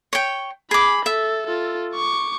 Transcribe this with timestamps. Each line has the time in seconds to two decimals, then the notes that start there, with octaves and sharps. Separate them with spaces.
0.13 C#5 G5
0.71 G#4 B5 D6
1.06 A4 E5
1.47 F4 A4
1.94 C#6 D6